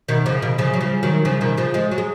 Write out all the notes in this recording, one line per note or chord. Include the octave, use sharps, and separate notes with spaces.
B2 D#3
C#3 F3
B2 D#3
C#3 F3
F#3
C#3 F3
D#3 F#3
C#3 F3
B2 D#3
C#3 F3
F3 G#3
F#3
G#3